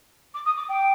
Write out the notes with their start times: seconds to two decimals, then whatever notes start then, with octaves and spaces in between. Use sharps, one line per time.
0.34 D6
0.45 D#6
0.56 D6
0.69 G5